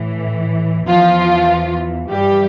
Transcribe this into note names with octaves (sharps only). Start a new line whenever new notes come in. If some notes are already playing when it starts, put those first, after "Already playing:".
Already playing: A2 E3
E2 E3 F3 F4
G2 E3 G3 G4